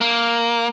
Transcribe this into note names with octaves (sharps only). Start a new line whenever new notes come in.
A#3